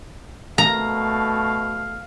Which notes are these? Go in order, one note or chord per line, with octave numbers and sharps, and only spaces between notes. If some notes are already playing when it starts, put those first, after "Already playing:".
B2 A3 F5 A#5